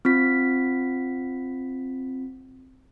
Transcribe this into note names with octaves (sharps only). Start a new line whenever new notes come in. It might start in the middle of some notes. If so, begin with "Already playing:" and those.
C4 F4 B6